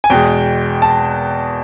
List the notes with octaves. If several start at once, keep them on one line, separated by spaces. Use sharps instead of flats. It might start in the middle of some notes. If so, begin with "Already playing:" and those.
G#5
E2 B2 G#3 G5
A5